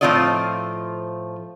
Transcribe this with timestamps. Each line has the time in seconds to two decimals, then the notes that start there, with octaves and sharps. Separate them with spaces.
0.01 A2 F3 C4 F4 D5 D#5